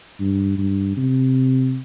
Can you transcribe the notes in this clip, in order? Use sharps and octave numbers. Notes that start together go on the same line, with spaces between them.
G2
G2
C3